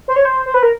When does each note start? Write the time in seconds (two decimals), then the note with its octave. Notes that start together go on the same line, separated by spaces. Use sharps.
0.08 C5
0.16 C#5
0.25 C5
0.46 C5
0.54 B4
0.63 A#4